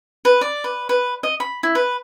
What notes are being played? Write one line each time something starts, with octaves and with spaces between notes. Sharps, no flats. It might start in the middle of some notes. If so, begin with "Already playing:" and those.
B4
D5
B4
B4
D#5
B5
E4
B4